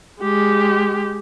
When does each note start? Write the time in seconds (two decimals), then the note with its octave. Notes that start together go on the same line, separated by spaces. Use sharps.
0.22 G#3 G4